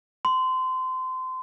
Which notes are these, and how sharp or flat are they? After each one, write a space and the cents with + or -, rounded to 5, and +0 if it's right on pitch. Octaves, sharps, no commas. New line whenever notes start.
C6 -25